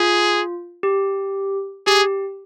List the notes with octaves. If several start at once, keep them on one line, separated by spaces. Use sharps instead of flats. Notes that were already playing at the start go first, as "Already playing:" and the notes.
Already playing: F4 G#4
G4
G4 G#4